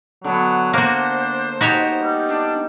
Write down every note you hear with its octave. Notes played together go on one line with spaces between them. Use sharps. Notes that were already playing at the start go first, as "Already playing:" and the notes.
D3 F#3 B3
A#3 D4 F#4 C5
D#4 F#4 G4 C#5
G3
D4